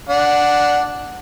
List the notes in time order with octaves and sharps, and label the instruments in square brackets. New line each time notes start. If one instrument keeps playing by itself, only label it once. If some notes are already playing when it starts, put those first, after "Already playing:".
[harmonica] D4 F#5